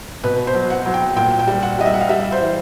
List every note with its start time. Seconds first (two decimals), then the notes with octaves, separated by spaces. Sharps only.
0.24 B2 B4
0.47 C5
0.55 F#3
0.70 F#5
0.86 F#3
0.94 G5
1.16 A#2 G5
1.39 G5
1.47 G3
1.63 F#5
1.78 G3 D#5
1.86 E5
1.94 F#5
2.01 F5
2.09 G3 E5
2.32 C5
2.40 E3